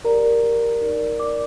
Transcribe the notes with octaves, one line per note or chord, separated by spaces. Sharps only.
G4 A#4 D5 A#5
D#4 A#4 D5
D5 D6